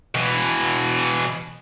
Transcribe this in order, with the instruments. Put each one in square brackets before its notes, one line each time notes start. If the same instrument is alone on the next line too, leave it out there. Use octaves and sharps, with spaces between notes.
[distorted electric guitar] B2 E3